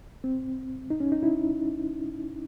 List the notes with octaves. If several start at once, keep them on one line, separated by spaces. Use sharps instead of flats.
C4
D#4
C#4
D#4
E4